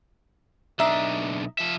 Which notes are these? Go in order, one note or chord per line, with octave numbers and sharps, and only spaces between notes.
B1 D4 D#4 E5
F3 E5